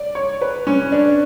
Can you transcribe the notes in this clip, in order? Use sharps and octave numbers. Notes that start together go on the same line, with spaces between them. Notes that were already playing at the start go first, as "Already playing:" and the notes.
Already playing: D5
C#5
B4
C#4
D4